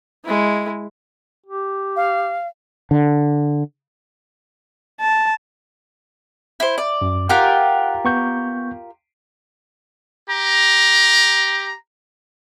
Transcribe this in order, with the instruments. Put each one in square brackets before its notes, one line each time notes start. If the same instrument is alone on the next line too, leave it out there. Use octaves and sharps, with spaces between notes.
[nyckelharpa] G#3 E4
[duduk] G4
[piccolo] F5
[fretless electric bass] D3
[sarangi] A5
[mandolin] E4 C5
D5
[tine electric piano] F#2
[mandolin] F4 G4 A#4 [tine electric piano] F#5 F#6
[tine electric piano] B3 C#6 G6
[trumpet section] G4 A#5